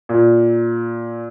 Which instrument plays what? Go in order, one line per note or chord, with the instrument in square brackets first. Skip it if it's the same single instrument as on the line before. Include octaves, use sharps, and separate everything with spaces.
[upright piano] A#2